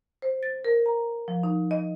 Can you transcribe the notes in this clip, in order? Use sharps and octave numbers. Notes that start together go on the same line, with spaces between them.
C5
A6
A#4
A#5
F3
D#4
D#5